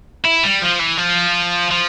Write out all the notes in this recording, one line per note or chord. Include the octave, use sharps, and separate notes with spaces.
E4
G3
F3
E3
F3
F3